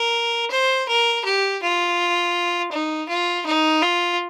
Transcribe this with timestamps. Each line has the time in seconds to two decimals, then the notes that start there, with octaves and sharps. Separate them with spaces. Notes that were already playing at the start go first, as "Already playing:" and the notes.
Already playing: A#4
0.51 C5
0.88 A#4
1.25 G4
1.63 F4
2.72 D#4
3.09 F4
3.46 D#4
3.82 F4